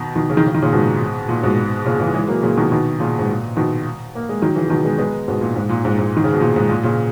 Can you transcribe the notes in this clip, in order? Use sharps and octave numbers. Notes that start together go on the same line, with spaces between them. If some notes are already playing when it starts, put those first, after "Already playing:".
Already playing: B2 D#3
B2 D#3
C#3
D#3
C#3
D#3
A#2 C#3
G#2 B2
A#2
G#2 B2
A#2 C#3
C#3 E3
E3 G#3
F#3 A#3
A#2 C#3
B2 D#3
B2 D#3
A#2 C#3
G#2
A#2
B2 D#3
A#3
G#3
D#3 F#3
C#3 E3
B2 D#3
G#3 B3
G#3 B3
G#2 B2
A#2
G#2
A#2
G#2
G#2
D#3
C#3
B2
A#2
G#2
A#2
A#2 C#3